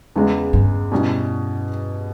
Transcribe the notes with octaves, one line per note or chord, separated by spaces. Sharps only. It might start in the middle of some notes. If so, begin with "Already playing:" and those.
E2 C#3 G#3
G2
B2 G3 C#4 E4